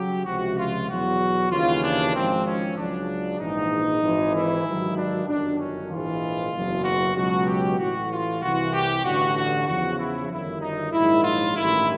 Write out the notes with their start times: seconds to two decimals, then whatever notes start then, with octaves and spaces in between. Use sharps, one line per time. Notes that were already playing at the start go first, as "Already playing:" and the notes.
Already playing: C#3 F#3 G4
0.25 C#2 C3 F3 F#4
0.57 F4
0.88 E2 B2 F#3 F#4
1.50 D#2 C#3 E3 F4
1.82 D4
2.13 G#1 G#2 F3 C4
2.45 C#4
2.76 C#2 C#3 F#3 D4
3.39 A#1 G#2 E3 D#4
4.02 G#1 G#2 E3
4.34 E4
4.65 G#1 G2 D#3 F#3
4.96 D4
5.27 G1 F#2 D#3 F#3 D4
5.58 C#4
5.90 A#1 G#2 E3 F4
6.53 F#1 E2 B2 F#3
6.84 F#4
7.15 C#2 B2 F#3 F#4
7.47 G4
7.78 A1 A2 E3 F#4
8.10 F4
8.41 C2 C3 E3 F#4
8.73 G4
9.03 A1 G2 D3 F#4
9.36 F#4
9.66 E2 C#3 F3 F#4
9.99 E4
10.30 G1 F#2 D#3 E4
10.61 D#4
10.92 A#1 G#2 D#3 F#3 E4
11.23 F4
11.55 A1 G2 D#3 E4